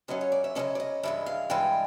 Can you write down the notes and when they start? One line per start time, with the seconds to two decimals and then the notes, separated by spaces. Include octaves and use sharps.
0.08 F#2 C#3 F#3 C#4 D#5
0.21 C#5
0.32 D5
0.44 E5
0.55 F#2 C#3 F#3 A3 C#4 D#5
0.75 D5
0.80 D#5
1.03 G2 E3 G#3 E5
1.26 F5
1.50 G2 E3 G#3 G5